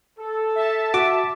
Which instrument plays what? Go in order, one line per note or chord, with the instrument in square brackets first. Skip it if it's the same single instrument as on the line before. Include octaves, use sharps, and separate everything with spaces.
[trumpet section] A4
[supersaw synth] E5 A5
[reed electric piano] F#4 [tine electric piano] D6